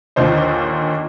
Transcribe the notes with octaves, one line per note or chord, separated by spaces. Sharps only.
A#1 D#2 A#2 D3 C5 D#5